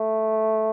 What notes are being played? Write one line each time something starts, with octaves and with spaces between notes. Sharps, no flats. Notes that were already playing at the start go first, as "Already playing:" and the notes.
Already playing: A3